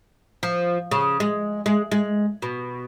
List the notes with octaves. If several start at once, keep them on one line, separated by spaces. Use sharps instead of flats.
F3
C#3
G#3
G#3
G#3
B2